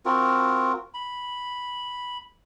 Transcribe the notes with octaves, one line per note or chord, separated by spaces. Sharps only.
C4 F4 F#4 A#4
B5